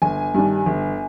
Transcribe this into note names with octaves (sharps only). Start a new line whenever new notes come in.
G1 G#5
G2 D#3 G3 D4
G1